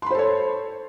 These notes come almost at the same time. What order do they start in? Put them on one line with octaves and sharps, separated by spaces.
C6 B5 C5 A4 C#5